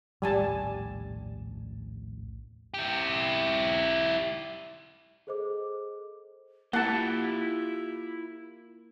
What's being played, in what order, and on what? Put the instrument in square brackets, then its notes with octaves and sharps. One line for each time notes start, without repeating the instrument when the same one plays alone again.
[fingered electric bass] A#1 D#2 A2 [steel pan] G3 G#5 A5
[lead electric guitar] E4 G4
[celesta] G#4 A4 C5 D#5 D6
[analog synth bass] A#3 [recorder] E4 [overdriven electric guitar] F4 G4 [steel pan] F#5 A5